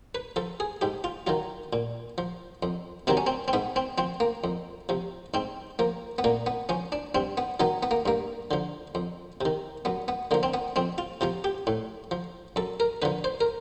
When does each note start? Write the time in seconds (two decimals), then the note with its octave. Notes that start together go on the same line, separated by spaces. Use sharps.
0.15 B4
0.36 F3 A4
0.60 G#4
0.81 G#2 G4
1.04 F4
1.27 D#3 F#3 F4
1.73 A#2
2.18 F3
2.63 F2
3.07 C3 D#3 F#3 C4
3.17 C#4
3.27 C4
3.48 C4
3.53 G#2 B3
3.76 C4
3.98 F3 C4
4.20 A#3
4.44 F2
4.89 C3 F3
5.34 G#2 C4
5.79 F3 A#3
6.18 B3
6.24 A#2 A#3
6.46 B3
6.69 F3 C#4
6.92 D4
7.15 G2 C4
7.37 B3
7.60 D#3 F#3 B3
7.83 B3
7.91 A#3
8.06 G2 A#3
8.51 D3 F3
8.95 F2
9.41 C3 D#3
9.85 F#2 B3
10.08 B3
10.31 D3 F3 A#3
10.43 C4
10.54 B3
10.76 F2 C4
10.98 F4
11.21 C3 F3 F4
11.44 G4
11.67 A2
12.11 F3
12.56 F#2 A4
12.80 A#4
13.02 D3 F3 B4
13.24 C5
13.41 A#4